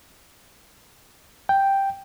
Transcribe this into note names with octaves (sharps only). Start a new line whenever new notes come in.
G5